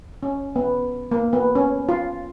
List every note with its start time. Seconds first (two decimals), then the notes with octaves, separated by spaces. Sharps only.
0.23 C#4
0.56 B3
1.11 A#3
1.33 B3
1.55 C#4
1.89 F4